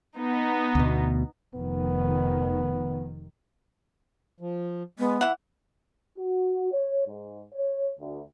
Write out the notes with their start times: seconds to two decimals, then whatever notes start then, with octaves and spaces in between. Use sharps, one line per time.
0.19 B3 D#4
0.75 D2 B2
1.54 F1 D#3 B3
4.40 F3
4.99 G#3 B3
5.21 E3 E5 F#5
6.17 F#4
6.72 C#5
7.06 G#2
7.54 C#5
7.99 D2